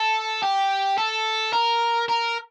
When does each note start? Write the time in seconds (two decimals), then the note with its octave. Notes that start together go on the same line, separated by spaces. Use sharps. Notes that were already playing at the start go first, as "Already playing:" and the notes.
Already playing: A4
0.43 G4
0.98 A4
1.53 A#4
2.08 A#4